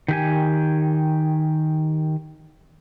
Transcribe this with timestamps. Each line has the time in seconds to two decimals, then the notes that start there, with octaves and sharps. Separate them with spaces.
0.08 D#3 G4 G#5